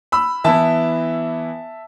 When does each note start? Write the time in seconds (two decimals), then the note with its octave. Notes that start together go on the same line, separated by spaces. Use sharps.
0.12 B5 E6
0.44 E3 B3 E4 E5 A5